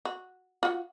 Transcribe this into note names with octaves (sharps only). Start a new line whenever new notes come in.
F#4
F4 F#4